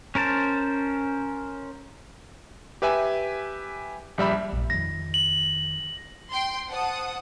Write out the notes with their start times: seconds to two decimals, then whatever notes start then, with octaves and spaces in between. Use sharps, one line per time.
0.15 C#4 A#4 C5 A5
2.82 G4 B4 E5 G#5
4.18 A#1 G3 E5 B5
4.52 A#1 G2
4.70 F2 D#3 A#6
5.14 F#7
6.30 G5 C6
6.68 C5 F#5 A5 D#6